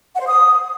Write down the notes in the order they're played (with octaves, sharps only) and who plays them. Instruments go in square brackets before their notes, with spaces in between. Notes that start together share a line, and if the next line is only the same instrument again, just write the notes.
[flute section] F#5
C5
D#6